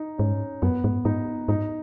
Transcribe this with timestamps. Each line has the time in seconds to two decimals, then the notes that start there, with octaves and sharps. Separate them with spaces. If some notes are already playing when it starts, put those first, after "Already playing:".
Already playing: D#4
0.18 G#2 C#4
0.62 F#2 B3
0.84 G#2
1.05 G#2 D#4
1.48 G#2 D#4